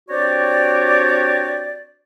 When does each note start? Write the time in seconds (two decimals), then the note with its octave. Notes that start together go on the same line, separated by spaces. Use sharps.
0.09 C4 D4 F#4 G4 C#5 D5